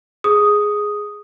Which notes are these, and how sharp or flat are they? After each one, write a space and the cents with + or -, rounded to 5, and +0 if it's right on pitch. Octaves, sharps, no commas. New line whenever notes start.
G#4 +0 D#6 +0